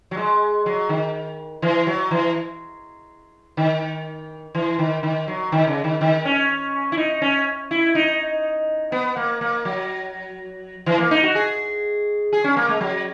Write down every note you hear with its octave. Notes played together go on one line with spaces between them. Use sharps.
F#3
G#3
F#3
D#3
E3
F#3
E3
D#3
E3
D#3
D#3
F#3
D#3
C#3
D#3
D#3
C#4
E4
D#4
C#4
E4
D#4
B3
A#3
A#3
F#3
E3
A#3
D#4
F#4
G#4
G#4
C#4
A#3
G#3
F#3